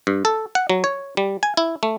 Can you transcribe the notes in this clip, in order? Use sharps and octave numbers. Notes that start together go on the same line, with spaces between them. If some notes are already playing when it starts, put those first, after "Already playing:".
G2
A4
F#5
F#3
C#5
G3
G#5
E4
A3